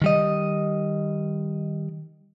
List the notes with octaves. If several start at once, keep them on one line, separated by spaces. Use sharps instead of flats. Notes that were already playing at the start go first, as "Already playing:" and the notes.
D#3 G3 D#5